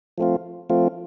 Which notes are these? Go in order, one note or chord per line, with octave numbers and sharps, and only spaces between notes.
F3 A3 C4 F4
F3 A3 C4 F4